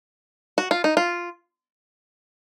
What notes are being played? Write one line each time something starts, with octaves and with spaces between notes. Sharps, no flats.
F#4
F4
D#4
F4